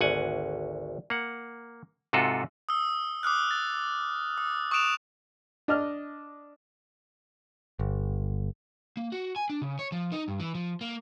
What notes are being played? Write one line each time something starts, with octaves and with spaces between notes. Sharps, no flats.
G#1 D2 F#5 G#5
A#3 F#5
G#2 C3 F4 F#4 A4
D#6 E6
D6 D#6 F6 F#6
A6
D#6
C#6 D#6 F#6 D7 E7 F7
D4 D#5 F6
G1
A#3
F#4
G#5
D4
C#3
C#5
F3
D#4
G2
E3
F3
A#3